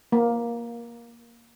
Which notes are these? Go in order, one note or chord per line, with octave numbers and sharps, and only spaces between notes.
A#3